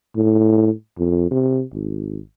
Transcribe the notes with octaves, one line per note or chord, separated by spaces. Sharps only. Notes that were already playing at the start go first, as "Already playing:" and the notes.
A2
F2
C3
G#1